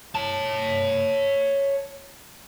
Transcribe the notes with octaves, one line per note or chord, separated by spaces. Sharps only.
C#5 A5